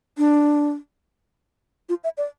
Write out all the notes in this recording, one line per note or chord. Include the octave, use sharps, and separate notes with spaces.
D4
F4
E5
D5